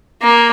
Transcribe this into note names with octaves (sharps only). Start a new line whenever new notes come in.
A#3